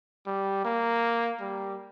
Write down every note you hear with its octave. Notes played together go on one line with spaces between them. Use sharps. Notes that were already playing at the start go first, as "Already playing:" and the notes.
G3
A#3
G3